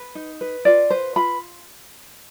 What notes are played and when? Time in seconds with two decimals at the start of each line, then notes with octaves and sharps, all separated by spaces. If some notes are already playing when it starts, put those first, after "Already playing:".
Already playing: B4
0.15 D#4
0.41 B4
0.65 F4 D5
0.90 B4 C5
1.16 F4 B5